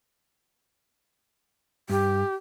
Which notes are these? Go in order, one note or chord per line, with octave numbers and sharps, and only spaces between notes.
G2 G4